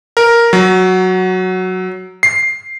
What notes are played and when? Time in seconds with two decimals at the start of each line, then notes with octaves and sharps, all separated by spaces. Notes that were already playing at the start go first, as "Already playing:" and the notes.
0.17 A#4
0.53 F#3
2.23 C7